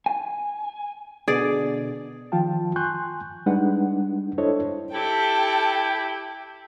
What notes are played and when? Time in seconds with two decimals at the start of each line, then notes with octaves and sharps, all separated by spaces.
0.06 G#5
1.28 B2 D3 G#4 D5
2.32 D#3 F3 F4 G5 A5
2.76 G#5 C6 C#6 F#6 G6
3.46 G3 G#3 D4 D#4 B4 F#5
4.38 D4 E4 A4 C5 C#5 D#5
4.94 E4 G4 A4 G5